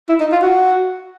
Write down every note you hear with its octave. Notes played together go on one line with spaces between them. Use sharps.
E4
D#4
F4
F#4